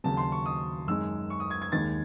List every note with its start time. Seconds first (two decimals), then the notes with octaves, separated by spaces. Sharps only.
0.04 D#2 C#3 F#3 A5
0.17 C6
0.32 C#6
0.46 D#6
0.87 F#2 D#3 G#3 E6
1.30 C#6
1.40 D#6
1.51 G#6
1.62 G#6
1.72 D#2 D#3 G#3 A6